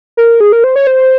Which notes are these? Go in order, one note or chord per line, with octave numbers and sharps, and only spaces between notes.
A#4
G#4
A#4
C5
C#5
C5